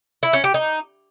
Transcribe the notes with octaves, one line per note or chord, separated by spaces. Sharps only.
E4
C#4
G4
D#4